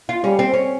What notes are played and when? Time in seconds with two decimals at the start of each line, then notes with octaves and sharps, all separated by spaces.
0.09 F4
0.24 G3 C#4
0.39 C4
0.54 C#4